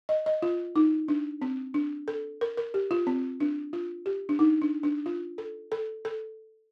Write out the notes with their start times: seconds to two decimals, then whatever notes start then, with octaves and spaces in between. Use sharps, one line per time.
0.09 D#5
0.26 D#5
0.42 F4
0.76 D#4
1.08 D4
1.42 C4
1.74 D4
2.08 A4
2.41 A#4
2.57 A#4
2.74 G4
2.91 F4
3.07 C4
3.40 D4
3.73 F4
4.06 G4
4.29 D4
4.39 D#4
4.62 D4
4.83 D4
5.06 F4
5.38 A4
5.72 A4
6.05 A4